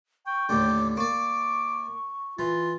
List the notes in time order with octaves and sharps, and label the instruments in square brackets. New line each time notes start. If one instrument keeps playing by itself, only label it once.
[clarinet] G5 [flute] C#6
[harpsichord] D#2 A2 D3 [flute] D6
[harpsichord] A#3 D5 [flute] C#6 [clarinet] D6
[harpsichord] E3 [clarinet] F4